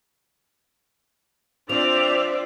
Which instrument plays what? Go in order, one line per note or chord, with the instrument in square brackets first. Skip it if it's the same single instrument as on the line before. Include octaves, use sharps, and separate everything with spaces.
[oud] F3 [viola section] C4 F4 D5 [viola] D4 E5 [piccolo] F7